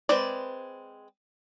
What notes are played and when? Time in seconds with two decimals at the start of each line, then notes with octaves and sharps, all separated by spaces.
0.09 G#3 C4 B4 D5